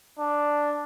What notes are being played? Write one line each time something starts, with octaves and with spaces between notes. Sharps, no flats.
D4